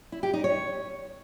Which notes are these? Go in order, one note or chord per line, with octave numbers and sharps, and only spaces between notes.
E4
G4
D#4
C#5